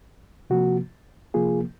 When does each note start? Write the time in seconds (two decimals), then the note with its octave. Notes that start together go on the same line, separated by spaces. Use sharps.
0.50 C3 F3 A#3 F#4
1.34 C3 F3 A#3 F4 G#4